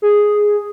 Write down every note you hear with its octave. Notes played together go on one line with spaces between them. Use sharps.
G#4